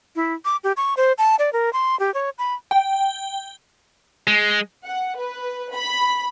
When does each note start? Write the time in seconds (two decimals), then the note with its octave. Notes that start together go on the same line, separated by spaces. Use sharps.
0.16 E4
0.45 D6
0.64 G4
0.77 C#6
0.97 C5
1.18 A5
1.39 D5
1.53 A#4
1.73 C6
1.99 G4
2.14 C#5
2.38 B5
2.71 G5
4.27 G#3
4.86 F#5
5.18 B4
5.73 B5